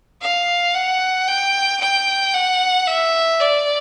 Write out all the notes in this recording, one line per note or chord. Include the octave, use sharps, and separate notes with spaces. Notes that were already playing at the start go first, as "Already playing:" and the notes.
F5
F#5
G5
G5
F#5
E5
D5